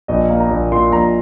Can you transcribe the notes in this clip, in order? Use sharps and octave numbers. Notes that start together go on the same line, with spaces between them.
A#1 D#5
A#3
A#5
A#1
A#2 C6
A#1 A#5